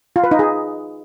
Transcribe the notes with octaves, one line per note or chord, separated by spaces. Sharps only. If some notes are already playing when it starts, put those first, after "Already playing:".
F4
B4
D#4
G#4